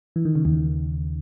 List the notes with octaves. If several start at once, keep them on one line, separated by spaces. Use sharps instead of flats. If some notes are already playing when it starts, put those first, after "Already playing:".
E3
D#3
C#3
D#2 D#3